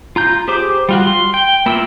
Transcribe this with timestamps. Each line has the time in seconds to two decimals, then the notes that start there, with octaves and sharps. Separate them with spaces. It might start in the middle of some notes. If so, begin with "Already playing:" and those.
0.16 F4 A#5 G6
0.48 G4 G#4 C5 D6
0.89 G3 F4 F#4
1.07 C6
1.34 G5
1.66 A#3 E4 F4 A#4 E6